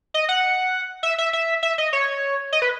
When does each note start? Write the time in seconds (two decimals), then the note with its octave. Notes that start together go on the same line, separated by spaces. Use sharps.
0.14 D#5
0.29 F#5
1.03 E5
1.18 E5
1.33 E5
1.63 E5
1.78 D#5
1.93 C#5
2.53 D#5
2.62 B4